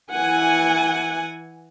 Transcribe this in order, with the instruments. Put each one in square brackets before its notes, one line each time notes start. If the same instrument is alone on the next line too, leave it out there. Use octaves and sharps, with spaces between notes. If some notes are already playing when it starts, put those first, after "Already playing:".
[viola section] E3 F#5 G#5